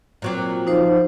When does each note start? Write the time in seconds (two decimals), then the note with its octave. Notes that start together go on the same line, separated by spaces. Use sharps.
0.22 A#2 F#3 C4
0.67 F3 D#4 C5